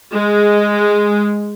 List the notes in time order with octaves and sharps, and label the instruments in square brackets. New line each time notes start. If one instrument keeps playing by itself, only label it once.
[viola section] G#3